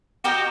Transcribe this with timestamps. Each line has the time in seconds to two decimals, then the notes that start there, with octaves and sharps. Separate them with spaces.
0.24 F#4 G4 A#4 D#5 G5